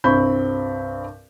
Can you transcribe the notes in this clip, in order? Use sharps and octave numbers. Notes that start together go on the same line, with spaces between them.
C2 G2 C4 B5 C#6 G6